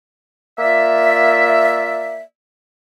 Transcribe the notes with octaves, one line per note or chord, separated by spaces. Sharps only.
A#3 F4 D5 E5